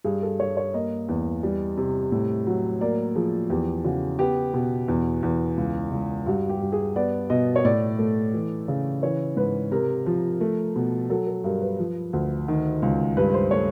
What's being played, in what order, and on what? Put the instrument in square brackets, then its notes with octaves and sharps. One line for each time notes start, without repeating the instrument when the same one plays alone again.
[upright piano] G2 G#4
A4
G2 C#5
C#5
A#3 D#5
E2
G3
C3
A2
F#3
A#3 D5
F3 G#4
E2 G4
C#3 F#4
B3 G4
B2
E2
E2
C#2
C#2
G2 F#4
G4
G2
G#4
B3 D5
B2 D#5
C#5
A2 D5
A3
E3
C#3
E3 C#5
G#2 B4
C3 A#4
F3
A3
B2
F#3 A4
A4
G2 A#4
B4
F3
D2
D#3
C#2
G2 B4
C5
A3 C#5